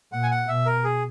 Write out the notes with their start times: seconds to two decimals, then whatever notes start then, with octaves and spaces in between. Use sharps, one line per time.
0.12 A#2 F#5
0.23 G#5
0.31 F#5
0.48 B2 E5
0.66 A#4
0.84 G#4